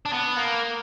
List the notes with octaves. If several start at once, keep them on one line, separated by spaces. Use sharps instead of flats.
D4
B3
A#3